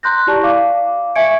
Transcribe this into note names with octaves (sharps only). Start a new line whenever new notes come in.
A#5 C6 F#6 G6 A#6
E4 G4 D5 A5 C#6
D5 F5 D6
E5 G#5 C#6 G#6 C#7 D7